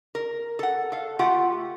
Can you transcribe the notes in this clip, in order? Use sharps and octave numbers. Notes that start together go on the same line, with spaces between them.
A#4
A4 F#5
A4 F5
A3 F4 G4 F#5